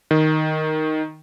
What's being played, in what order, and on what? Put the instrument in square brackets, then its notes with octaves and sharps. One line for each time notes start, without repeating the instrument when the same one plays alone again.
[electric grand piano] D#3